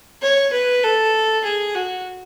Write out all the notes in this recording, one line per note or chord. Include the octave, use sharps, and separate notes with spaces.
C#5
B4
A4
G#4
F#4